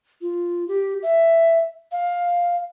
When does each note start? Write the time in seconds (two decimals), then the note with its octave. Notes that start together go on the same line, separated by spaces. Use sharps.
0.22 F4
0.68 G4
1.03 E5
1.92 F5